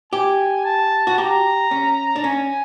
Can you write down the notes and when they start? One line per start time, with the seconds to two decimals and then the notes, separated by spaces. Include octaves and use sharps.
0.13 G4 G#5
0.65 A5
1.07 F#4
1.18 G4 A#5
1.71 C#4
2.16 D4
2.24 C#4 G#5